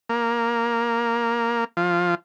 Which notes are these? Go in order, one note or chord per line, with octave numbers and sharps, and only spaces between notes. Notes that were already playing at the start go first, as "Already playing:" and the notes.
A#3
F3